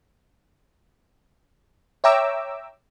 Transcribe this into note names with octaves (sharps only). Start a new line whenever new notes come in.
C#5 E5 G5 A#5 D6 E6